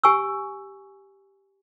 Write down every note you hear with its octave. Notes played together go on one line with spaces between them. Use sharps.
G4 G#5 C#6 E6